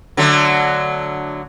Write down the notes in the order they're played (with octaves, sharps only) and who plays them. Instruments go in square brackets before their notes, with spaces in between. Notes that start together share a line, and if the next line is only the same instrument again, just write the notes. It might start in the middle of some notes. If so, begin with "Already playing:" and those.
[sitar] D3 F#3 A3